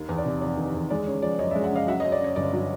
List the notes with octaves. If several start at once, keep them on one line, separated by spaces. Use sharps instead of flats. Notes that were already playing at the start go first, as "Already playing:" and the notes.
Already playing: D#2 D#3
E2
D5
C3
F1 D5
D#3
E2
G#3 D5
C#3 C#5
F3 D5
F#2 C#5 D#5
D5 E5
G#3
E5 F#5
C#3 D#5 F5
F#3 E5 F#5
C#5 D#5
F#2
D5
C#3 C#5
G1 D5
F#3